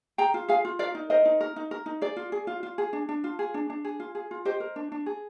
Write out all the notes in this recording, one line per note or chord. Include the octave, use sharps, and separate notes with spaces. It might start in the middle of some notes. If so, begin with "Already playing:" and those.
G#4 G5 A#5
F4
G#4 F5 G#5
F4
A#4 D5 F5
D#4
A#4 C5 D#5
D#4
A#4
D#4
A#4
D#4
G#4 D5
F4
G#4
F4
F4
G#4
D4
D4
F4
G#4
D4
D4
G#4
F4
G#4
F4
G4 C5 D#5
A#4
D4
D4
G#4